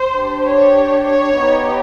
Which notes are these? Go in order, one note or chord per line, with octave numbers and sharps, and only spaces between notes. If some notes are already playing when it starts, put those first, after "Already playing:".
Already playing: C5
D4 G4
C#5
C#5
B3 D#4 G4